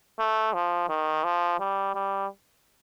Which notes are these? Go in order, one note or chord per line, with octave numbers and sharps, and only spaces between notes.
A3
F3
D#3
F3
G3
G3